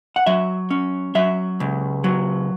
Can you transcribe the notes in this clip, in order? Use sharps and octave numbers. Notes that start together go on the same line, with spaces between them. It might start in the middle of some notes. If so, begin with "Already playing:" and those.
F#5
F#3 E5
C#4
F#3 E5
C#2
F#3